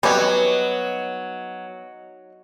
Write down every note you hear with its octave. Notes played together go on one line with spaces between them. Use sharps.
F#3 G3 B3 C#4 D#4 C#5 D#5 F#5